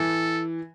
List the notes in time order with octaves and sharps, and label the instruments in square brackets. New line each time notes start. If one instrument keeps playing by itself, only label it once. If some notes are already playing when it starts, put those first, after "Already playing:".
Already playing: [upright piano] E3 [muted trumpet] A4